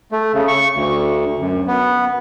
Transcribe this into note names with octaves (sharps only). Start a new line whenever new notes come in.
A3
C#3
C#6
D2
F#2
B3